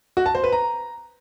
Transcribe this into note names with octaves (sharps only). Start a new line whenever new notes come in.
F#4
A5
C5
B4
A#5